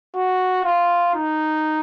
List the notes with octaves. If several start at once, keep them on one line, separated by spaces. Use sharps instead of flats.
F#4
F4
D#4